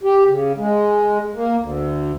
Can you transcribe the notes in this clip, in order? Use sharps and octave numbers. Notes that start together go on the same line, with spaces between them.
G4
C#3
G#3
A#3
D2